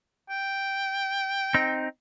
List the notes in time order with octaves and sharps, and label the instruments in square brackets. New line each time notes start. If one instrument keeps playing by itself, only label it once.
[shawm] G5
[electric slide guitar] C4 D#4